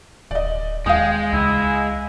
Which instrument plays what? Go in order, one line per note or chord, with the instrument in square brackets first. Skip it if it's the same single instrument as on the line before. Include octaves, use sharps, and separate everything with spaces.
[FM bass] D1 [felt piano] D5 D#5
[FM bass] D#2 [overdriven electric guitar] G#3 [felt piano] F5 D#6 [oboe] G5
[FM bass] C#2 [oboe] E4